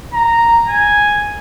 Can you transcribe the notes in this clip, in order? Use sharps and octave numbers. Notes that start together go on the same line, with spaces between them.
A#5
G#5